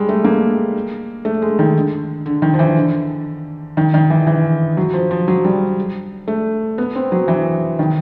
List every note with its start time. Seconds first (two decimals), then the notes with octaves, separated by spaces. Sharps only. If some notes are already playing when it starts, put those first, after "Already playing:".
Already playing: G3 G#3
0.09 A3
0.24 A#3
1.25 A3
1.42 G#3
1.59 D#3
1.76 D3
2.26 D3
2.42 D#3
2.54 F3
2.59 E3
2.77 D3
3.77 D#3
3.94 D#3
4.10 E3
4.27 E3
4.77 F#3
4.93 F3
5.11 F3
5.28 F#3
5.45 G3
6.28 A3
6.78 B3
6.95 C4
7.12 F#3
7.28 E3
7.79 D#3